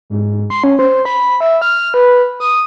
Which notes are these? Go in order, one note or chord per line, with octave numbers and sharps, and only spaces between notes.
G#2
C6
C#4
C5
B5
E5
F6
B4
D#6